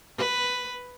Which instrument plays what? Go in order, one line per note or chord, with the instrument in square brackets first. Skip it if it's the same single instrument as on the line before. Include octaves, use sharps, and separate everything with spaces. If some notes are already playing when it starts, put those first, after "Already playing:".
[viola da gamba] B4